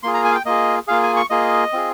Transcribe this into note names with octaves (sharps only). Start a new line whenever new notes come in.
A#3 F4 G#4 C6
A#5
G#5
F5
G5
A#3 F4 G#4 D#5
A#3 F4 G#4 F5
G#5
C#6
A#3 F4 G#4 D#5
C4 F4 G#4